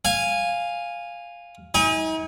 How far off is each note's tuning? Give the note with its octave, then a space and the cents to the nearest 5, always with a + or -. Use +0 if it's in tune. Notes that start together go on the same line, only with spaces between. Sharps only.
F5 +0 G#5 -10
D#4 +45 G#5 -15